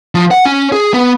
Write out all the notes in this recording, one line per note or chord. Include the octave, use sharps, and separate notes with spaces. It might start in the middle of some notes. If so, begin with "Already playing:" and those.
F3
F#5
C#4
G#4
B3